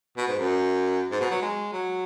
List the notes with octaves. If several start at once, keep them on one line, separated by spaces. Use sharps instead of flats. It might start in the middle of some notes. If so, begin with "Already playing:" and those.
B2
G#2
F#2
G#2
B2
F#3
G#3
F#3